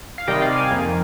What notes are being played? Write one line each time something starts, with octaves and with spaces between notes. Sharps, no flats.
F5
C3 D#3 G3 D#5 G5
D5 F5
F5 G#5
F2 D#3 A#3